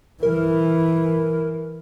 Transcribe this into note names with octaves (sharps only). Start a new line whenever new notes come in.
E3 A#4